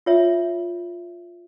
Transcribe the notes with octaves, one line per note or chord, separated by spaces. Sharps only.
F4 C#5 E5